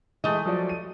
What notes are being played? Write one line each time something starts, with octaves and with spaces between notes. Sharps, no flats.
E3 G#3 A3 D#5
F3 F#3 D5
D#7